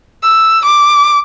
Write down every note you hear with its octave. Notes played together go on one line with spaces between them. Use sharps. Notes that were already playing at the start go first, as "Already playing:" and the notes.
E6
D6